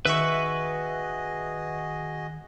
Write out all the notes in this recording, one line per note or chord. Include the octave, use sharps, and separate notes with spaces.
D#3 F#4 G#4 B4 D#5 E5 C#6